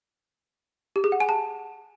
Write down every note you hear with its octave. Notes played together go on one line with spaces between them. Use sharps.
G4
G#4
F#5
G#5
A5